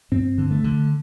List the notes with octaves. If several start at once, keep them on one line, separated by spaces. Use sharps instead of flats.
G2 C4
D3
A3
D3